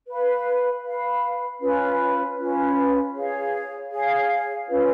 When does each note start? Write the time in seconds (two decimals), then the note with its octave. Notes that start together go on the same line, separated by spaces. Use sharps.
0.08 B4 F5 B5
0.85 B4 F5 B5
1.61 C#4 F4 B4
2.38 C#4 F4 B4
3.14 G#4 C#5 F5
3.92 G#4 C#5 F5
4.67 C#4 F4 B4